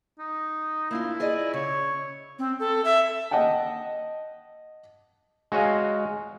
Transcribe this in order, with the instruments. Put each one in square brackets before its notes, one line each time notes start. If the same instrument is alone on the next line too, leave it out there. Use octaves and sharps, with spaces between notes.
[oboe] D#4
[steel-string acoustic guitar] A#3 D4 F4 [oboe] E4
[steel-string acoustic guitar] G#4 D5 D#5
[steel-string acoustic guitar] C#3 [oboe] C#5
[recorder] C4
A4
E5
[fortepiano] D#5 F#5 G5 A5
[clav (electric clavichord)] G#3 F#4 C#5 D#5 F5